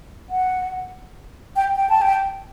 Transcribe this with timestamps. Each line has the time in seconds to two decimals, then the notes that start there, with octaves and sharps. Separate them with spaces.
0.30 F#5
1.56 G5
1.76 G5
1.89 A5
2.02 G5